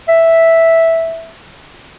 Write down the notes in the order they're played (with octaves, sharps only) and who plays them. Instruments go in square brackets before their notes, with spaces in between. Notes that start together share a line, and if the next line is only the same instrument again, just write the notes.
[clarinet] E5